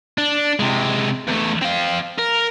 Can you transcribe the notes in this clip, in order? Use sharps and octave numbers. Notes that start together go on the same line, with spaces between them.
D4
C3 G#3
E2 A3
C4 F5
A#4